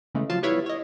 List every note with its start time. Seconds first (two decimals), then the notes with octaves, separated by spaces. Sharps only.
0.15 C#3 E3 G#3 A3
0.29 F3 F#3 F4 F5 A5
0.42 G3 B3 E4 C#5 E5 F5
0.66 C#5 D#5